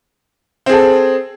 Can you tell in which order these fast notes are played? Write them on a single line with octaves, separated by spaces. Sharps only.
C4 G#4 A4